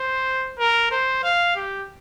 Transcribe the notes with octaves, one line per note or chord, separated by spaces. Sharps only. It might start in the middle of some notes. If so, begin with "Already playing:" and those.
Already playing: C5
A#4
C5
F5
G4